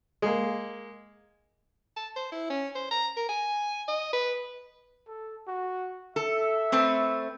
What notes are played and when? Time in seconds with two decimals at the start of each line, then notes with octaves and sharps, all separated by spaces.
0.22 G#3 A#3
1.97 A5
2.16 C5
2.32 E4
2.50 C#4
2.75 C5
2.91 A#5
3.17 A#4
3.29 G#5
3.88 D#5
4.13 B4
5.08 A4
5.47 F#4
6.16 A4 E5
6.72 A3 C4 B4